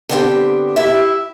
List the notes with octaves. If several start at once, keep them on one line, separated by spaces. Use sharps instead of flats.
D3 B3 C4 D4 G4 G5
E4 G4 E5